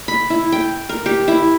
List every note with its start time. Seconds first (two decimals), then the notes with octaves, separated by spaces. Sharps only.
0.08 B5
0.30 E4
0.52 G5
0.89 A#4
1.06 G4
1.28 E4